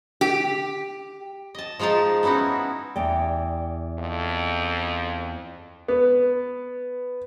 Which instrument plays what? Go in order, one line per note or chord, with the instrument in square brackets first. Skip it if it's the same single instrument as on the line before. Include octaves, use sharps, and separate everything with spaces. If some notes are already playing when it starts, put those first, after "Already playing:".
[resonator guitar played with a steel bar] G4
[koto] D#5 A5
F3 G#3 D#4 F4 A5
B3 C#4 D#4 E4 F#4
[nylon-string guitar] E2 D5 G5
[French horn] F2
[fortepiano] B3